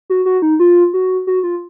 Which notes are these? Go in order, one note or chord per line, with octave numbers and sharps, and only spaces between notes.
F#4
F#4
D#4
F4
F#4
F#4
F4